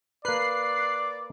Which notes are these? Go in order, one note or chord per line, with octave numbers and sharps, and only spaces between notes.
A#3 B4 D5 F#6 C7